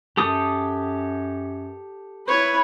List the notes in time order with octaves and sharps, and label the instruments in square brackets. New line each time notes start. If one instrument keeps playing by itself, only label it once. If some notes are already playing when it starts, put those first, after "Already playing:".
[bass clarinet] F#2 [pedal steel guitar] G4 A4 D#6
[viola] E4 B4 [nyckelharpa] C#5